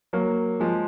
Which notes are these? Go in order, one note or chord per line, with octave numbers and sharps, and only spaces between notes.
F#3 A#3
F3 G#3